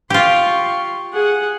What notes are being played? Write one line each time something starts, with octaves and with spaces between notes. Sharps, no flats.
F4 G4 C6 C#6
G#4 F#5